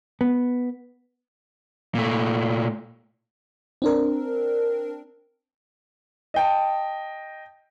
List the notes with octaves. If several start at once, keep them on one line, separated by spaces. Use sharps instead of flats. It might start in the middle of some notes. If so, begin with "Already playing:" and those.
B3
A#2 A3
C4 D4 A#4
D#5 G5 A5